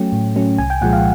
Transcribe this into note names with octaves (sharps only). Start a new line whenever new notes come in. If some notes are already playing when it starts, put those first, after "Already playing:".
Already playing: F#3 A3 C#4 G5
A2
F#3 A3 C#4
C2 G#5
G5
A#2 F3 G#3 F#5
F5